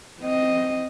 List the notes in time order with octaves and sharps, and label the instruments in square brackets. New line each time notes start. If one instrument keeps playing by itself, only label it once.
[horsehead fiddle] C4 D#5